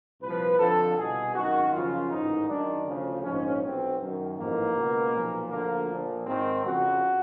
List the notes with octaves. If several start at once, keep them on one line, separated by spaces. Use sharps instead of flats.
C2 A#2 F3 B4
F2 D3 F3 A4
C2 B2 G#4
G#1 F#2 D#3 F#4
F#2 C#3 F3 F4
A1 G#2 D#3 D#4
F#2 D#3 D4
D2 C#3 F3
A#1 G#2 F3 C#4
B1 B2 C4
F#2 D#3
A1 G#2 F3 A#3
C#2 B2
B1 A#2 F3
D2 D3 F3 A#3
A#1 A#2 F3
G#1 G#2 D#3 C4
F2 C#3 F3 F#4